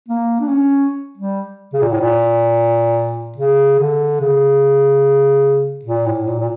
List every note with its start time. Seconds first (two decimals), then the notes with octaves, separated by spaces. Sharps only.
0.08 A#3
0.41 D4
0.49 C#4
1.18 G3
1.73 C#3
1.82 A#2
1.92 A2
2.01 A#2
3.38 C#3
3.80 D3
4.21 C#3
5.85 A#2
6.07 A2
6.27 A#2
6.40 A#2